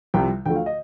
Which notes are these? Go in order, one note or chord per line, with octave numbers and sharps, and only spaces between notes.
C2 C3 F3 G5
D2 D3 F3 A3 G5
F5
D#5